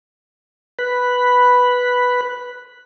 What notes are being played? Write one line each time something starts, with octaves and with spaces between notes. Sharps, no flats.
B4 B5 F#6